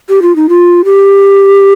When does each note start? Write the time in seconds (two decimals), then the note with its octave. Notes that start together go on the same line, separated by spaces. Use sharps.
0.09 G4
0.22 F4
0.36 D#4
0.49 F4
0.85 G4